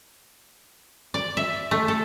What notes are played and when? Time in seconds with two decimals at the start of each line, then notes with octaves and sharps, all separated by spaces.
1.14 D5
1.37 E5
1.71 A3
1.88 A4